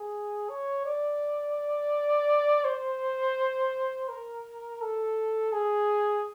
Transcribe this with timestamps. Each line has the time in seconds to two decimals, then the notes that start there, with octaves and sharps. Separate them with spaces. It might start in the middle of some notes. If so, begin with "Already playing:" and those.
Already playing: G#4
0.50 C#5
0.86 D5
2.65 C5
4.09 A#4
4.81 A4
5.52 G#4